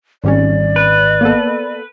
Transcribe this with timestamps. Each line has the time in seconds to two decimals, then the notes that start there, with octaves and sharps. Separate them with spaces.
0.24 G#1 G#2 G3 C#4 D5
0.76 B4
1.21 A#3 B3 A4